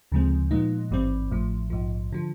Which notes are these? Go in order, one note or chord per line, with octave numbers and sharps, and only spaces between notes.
D2 C#3 F3 G#3 C4
A#2 F3 G#3 B3 D#4
G#1 G2 E3 G3 C4
A1 A2 F3
A#1 G#2 F3
D3 F3